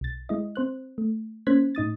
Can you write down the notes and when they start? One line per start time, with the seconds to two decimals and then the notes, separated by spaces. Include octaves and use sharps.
0.01 B1 A6
0.29 G#3 E4 D#5
0.55 C4 C5 F#6
0.98 A3
1.47 A#3 C#4 C5 F#6 G#6 B6
1.75 A2 D#4 D#6 A6